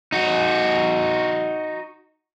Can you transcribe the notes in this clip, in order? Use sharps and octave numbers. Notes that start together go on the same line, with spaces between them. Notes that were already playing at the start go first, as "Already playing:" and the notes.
D#4 F#4